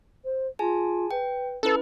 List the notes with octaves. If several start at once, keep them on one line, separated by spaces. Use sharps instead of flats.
C5
F4 G#4 G#5 A5
B4 G5
C#4 E4 A4 B4